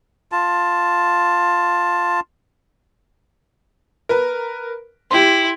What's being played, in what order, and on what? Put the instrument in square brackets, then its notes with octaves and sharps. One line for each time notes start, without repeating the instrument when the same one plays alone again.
[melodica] F4 A5
[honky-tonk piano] A#4 B4
[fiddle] E4 [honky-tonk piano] G4 C6